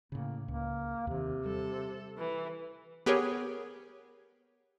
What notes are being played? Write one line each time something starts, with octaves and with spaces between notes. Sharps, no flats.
A2 C#3 A#3
C#2 A#3
D#2 C3 D#3
G3 A4
E3
B3 G4 G#4 A#4 C#5